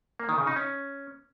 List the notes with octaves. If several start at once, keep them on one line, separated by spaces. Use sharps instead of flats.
A#3
D#3
C#3
D#4
C#4